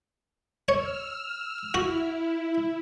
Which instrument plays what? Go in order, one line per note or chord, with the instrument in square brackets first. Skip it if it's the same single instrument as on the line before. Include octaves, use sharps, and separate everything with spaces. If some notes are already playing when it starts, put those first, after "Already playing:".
[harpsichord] C#5 [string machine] E6 F6
[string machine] E4 [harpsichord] F#4